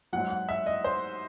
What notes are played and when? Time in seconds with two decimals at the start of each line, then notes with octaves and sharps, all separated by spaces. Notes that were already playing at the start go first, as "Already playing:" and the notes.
0.13 G#2 F#3 F#5
0.30 F#5
0.49 E5
0.66 D#5
0.84 C5